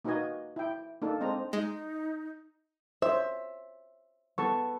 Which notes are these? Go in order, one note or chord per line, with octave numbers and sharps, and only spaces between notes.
A#3 D#4 F#4 B4 D#5 G#5
E4 G5
A#3 D4 D#4 A4
G#3 C4 D4 C5 D#5 A#5
G#3 D#4
C5 C#5 E5
B3 A4 C#6